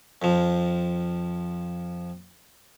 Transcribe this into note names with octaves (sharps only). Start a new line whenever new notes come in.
F2 F3